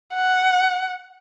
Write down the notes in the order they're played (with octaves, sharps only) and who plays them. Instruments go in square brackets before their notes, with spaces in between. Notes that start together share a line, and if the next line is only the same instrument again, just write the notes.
[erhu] F#5